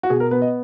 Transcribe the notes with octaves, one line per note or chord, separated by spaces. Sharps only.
F#4
B2 G#4
A#4
B3 B4
D#5